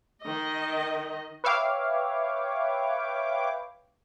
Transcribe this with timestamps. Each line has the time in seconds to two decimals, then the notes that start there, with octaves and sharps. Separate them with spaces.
0.22 D#3 D#5
1.44 B4 C#5 E5 F5 G5 D6